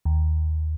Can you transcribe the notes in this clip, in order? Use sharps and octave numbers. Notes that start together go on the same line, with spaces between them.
D#2